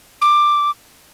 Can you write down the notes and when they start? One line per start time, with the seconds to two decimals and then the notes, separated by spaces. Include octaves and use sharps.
0.22 D6